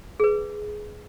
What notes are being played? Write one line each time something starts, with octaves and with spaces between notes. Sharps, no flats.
G#4 B4